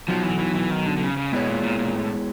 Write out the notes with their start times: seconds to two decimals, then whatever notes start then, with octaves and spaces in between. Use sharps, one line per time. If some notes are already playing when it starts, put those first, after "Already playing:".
0.08 F3 F#3 B3 D#4 F#4
0.23 E3
0.39 E3
0.55 E3
0.70 D#3
0.86 D3
0.97 D3
1.02 C#3
1.17 C#3
1.32 B2 G#3 B3 E4 G#4 C#5
1.48 A#2
1.63 A#2
1.79 A#2
1.95 A2